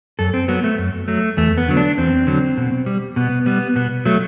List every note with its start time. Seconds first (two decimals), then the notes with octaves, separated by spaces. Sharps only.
0.19 F#2 A4
0.34 C4
0.48 F#3 B3
0.64 A3
0.78 F#2
1.08 F#3 A3
1.37 E2 A3
1.58 B3
1.68 D3 F#3
1.77 D4
1.98 E2 C4
2.27 D3 F#3
2.58 B2
2.86 G3
3.16 B2 B3
3.46 G3 B3
3.76 B2 B3
4.05 F#3 A3